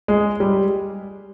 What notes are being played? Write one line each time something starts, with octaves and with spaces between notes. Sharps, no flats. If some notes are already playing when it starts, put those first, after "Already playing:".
G#3
G3